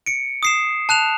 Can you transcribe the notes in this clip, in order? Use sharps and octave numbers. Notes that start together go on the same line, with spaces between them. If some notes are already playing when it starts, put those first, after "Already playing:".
C#7 D7
D#6 C7 E7
A5 F#6 E7 F7